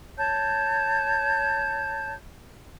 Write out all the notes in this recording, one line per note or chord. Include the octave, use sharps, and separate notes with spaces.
C#5 A5 G6